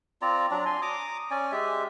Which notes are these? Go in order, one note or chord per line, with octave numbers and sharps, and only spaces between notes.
C4 F4 D5 A#5
F#3 D4 D5 A#5
G#5 C6
A#5 D6 D#6
C#4 D5 G#5
G#3 G4 E5